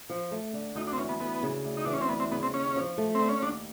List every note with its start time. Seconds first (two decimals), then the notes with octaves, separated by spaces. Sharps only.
0.10 F3
0.31 A3
0.53 D3
0.75 D2 D#4
0.87 D4
0.93 C4
0.98 E3 C#4
1.09 B3
1.20 D2 B3
1.43 C#3
1.64 D2
1.77 D#4
1.85 E3 D4
1.93 C#4
2.01 C4
2.09 D2 B3
2.20 C4
2.31 C#3 B3
2.43 C4
2.53 D#2 C#4
2.76 F3
2.98 A3
3.15 C4
3.20 D3
3.29 C#4
3.42 D#2 D4